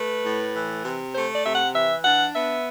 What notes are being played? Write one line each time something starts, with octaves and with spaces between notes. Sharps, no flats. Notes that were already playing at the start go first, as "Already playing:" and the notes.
Already playing: A3 B4
A2
E3
C3
A3 C5
D5
C3 E5
F#5
E3 E5
D4 F#5
B3 E5